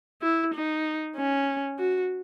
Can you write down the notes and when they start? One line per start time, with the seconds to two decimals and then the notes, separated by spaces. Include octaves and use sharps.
0.22 E4
0.54 D#4
1.16 C#4
1.78 F#4